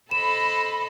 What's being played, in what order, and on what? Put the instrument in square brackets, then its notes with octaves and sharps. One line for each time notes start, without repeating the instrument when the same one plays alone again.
[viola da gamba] A4 C5 D#5 [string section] B5 [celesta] E7